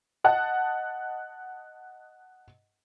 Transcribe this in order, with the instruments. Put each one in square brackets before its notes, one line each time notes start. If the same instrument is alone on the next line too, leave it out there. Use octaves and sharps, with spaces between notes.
[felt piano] D#5 F#5 A5